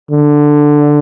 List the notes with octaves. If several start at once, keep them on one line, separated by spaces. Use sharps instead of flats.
D3